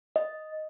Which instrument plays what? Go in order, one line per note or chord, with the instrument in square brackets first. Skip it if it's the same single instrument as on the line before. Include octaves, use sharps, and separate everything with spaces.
[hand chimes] D#5